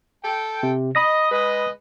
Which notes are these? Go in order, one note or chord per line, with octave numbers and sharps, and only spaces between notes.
A4 G5
C3
D#5 B5 D#6 A#6
G#3 B4 D#5